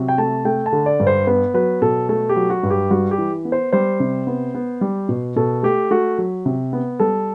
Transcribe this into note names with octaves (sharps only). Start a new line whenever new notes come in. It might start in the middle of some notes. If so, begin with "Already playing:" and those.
Already playing: C3 F#3
G5
A3 A5
A3 G5
A5
D3
D5
G2
C5
B3 B4
F#3 B4
B2 A4
A3 A4
G4
F#3
F#4
G2
G4
G3 F#4
G4
E3
B3
C5
G3 C5
C3
B3
B3
G3
B2
B2 A4
A3 G4
A3 F#4
F#3
C3
B3
G3 A4